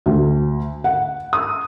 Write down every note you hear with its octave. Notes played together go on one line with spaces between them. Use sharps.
D2
F#5
D#6